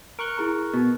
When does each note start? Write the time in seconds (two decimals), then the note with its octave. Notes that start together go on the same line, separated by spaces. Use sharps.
0.19 A#4 C#6 F#6 D7 G7
0.38 E4 G#4 A#5
0.74 B2